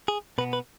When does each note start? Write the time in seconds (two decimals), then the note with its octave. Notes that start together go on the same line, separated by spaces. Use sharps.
0.08 G#4
0.38 B2 B3 B4
0.53 B4